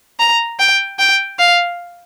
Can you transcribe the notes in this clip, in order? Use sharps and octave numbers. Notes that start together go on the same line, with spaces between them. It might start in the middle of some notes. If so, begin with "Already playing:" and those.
A#5
G5
G5
F5